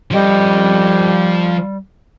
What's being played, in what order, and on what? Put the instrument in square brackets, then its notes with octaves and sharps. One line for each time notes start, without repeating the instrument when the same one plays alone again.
[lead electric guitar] F3 D#5 [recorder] G3